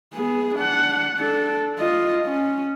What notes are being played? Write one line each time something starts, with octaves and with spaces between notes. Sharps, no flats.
B3 G#4
D4 F#5
D4 A4
F4 D#5
C#4